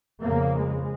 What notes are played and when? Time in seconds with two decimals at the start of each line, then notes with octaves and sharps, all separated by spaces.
0.22 F2 C#3 A#3
0.58 G#3